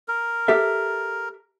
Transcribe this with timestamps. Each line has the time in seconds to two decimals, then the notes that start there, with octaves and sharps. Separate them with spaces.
0.08 A#4
0.48 G4 A4 E5